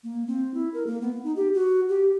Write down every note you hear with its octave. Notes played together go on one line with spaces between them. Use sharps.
A#3
C4
E4
A#4
A#3
B3
D#4
G4
F#4
G4